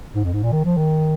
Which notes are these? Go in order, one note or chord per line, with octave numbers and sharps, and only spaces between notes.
G#2
F2
G#2
A#2
D#3
F3
D#3